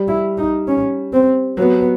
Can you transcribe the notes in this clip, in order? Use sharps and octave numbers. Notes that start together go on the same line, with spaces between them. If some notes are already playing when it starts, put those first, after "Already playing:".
Already playing: G3
E4
D#4
C#4
C4
F#3 B3